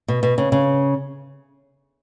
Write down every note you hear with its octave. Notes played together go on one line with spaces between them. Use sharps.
B2
B2
C#3
C#3